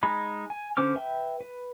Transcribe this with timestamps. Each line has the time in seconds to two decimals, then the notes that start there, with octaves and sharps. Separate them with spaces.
0.03 G#3 D#4 B5
0.50 G#5
0.77 D3 C#4 C5 D6 F6
0.95 B4 E5 G5
1.41 B4